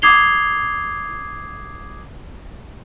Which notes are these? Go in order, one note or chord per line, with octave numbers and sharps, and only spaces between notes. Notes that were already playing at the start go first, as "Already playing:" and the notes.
D6 D#6 G#6 C7 F7 G7